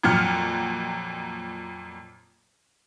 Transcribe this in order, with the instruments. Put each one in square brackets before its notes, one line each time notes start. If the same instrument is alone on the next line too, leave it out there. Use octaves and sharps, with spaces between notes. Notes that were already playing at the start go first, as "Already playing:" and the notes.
[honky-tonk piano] F2 A#2 F#3 F6 C#7